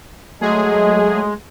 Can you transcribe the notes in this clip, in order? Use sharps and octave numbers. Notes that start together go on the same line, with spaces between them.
F#3 G#3 A3 G#4